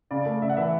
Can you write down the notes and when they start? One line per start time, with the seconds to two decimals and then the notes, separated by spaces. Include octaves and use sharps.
0.11 C#3 D5
0.26 A3
0.42 C#3 E5
0.50 F#5
0.57 E3 E5